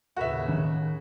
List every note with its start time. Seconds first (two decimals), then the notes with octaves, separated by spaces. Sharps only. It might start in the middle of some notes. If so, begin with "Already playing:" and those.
0.16 D#2 A2 C#3 F#4 B4 E5
0.48 D#3 C#4